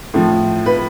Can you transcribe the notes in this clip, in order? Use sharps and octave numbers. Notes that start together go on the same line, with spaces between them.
A2 F3
B4